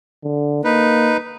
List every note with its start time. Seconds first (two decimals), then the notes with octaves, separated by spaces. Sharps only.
0.23 D3
0.64 A#3 D#4 B4